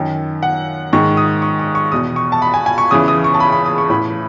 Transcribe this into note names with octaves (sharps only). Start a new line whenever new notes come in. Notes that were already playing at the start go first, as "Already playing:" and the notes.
Already playing: F#2 D#3
F#5
G#2 D#3 C#6
D#6
C#6
C#6
C#6
E2 B2 D#6
C#6
A5
B5
G#5
G#5
C#6
E2 C#3 E3 D#6
D#6
C#6
A5
B5
B5
D#6
C#6
A2 E3 B5